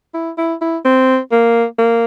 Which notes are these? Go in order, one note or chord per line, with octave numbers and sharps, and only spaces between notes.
E4
E4
E4
C4
A#3
A#3